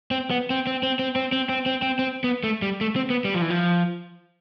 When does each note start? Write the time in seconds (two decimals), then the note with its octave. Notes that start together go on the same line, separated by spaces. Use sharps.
0.11 C4
0.30 B3
0.50 C4
0.67 C4
0.83 C4
0.99 C4
1.16 C4
1.32 C4
1.49 C4
1.66 C4
1.82 C4
1.99 C4
2.24 B3
2.44 A3
2.62 G3
2.81 A3
2.96 C4
3.10 B3
3.25 G3
3.34 F3
3.42 E3
3.50 F3